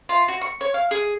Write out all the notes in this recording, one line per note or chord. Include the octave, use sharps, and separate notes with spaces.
F4
F#4
C#6
C#5
F5
G#4